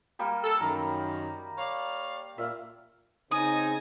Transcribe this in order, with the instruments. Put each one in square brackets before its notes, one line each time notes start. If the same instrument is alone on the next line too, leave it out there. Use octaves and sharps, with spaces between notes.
[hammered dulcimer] G3 A#3 G4
[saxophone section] A4
[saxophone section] F#2 D#3 [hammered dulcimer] A#5
[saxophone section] C#5 D5 F5
[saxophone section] A#2 [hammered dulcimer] E5 F5
[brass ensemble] C#3 C4 D#4 [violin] G#5 A#6 [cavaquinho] D#6